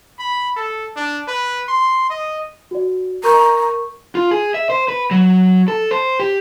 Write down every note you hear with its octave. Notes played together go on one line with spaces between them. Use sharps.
B5
A4
D4
B4
C6
D#5
F#4 D5
A#4 A#5 C#6 G6
F4
G#4
E5
C5
B4
F#3
A4
C5
G4